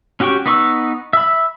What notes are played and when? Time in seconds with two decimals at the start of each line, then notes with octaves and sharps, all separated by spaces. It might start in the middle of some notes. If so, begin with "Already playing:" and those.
0.20 C#4 F#4 G4 G5 C#6
0.46 B3 D#4 B4 C#6 E6
1.13 E5 B5